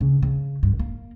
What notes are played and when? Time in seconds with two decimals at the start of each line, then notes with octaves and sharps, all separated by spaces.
0.01 C#3
0.23 C#3
0.63 G2
0.79 A#3